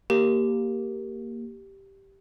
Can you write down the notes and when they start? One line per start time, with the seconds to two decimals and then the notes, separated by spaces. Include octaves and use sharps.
0.10 A#3 G4